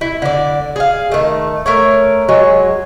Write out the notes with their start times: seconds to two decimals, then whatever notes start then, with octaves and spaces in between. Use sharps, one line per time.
0.01 E4
0.22 D3 D5
0.76 G#4 F5
1.11 D#3 A3
1.66 A3 A#4 C#5
2.28 F#3 G#3 C#5